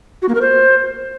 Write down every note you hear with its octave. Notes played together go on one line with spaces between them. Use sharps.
F#4
A#3
A#4
C5